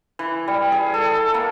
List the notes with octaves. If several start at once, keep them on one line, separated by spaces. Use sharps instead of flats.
E3
G3
G#4
A4
A#3